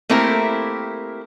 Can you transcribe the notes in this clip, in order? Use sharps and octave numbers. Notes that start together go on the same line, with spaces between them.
A3 A#3 C4 E4 G4 A#4